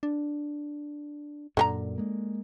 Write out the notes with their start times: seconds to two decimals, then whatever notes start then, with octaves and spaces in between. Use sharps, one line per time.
0.03 D4
1.57 F#2 A#2 D3 G4 A#5
1.98 G#3 A#3